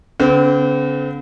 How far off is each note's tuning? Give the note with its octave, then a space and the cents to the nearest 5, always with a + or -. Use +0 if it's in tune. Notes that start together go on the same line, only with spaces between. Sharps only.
D3 -45 C4 -40